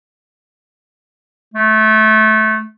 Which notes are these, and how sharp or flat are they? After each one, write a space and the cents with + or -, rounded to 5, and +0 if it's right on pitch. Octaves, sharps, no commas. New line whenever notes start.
A3 -20